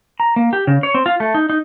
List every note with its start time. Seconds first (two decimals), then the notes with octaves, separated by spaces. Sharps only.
0.20 A#5
0.36 A#3
0.53 G4
0.67 C#3
0.83 C#5
0.94 C4
1.06 F4
1.20 A3
1.34 D#4
1.50 D#4